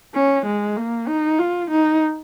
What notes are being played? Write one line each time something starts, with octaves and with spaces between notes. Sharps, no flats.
C#4
G#3
A#3
D#4
F4
D#4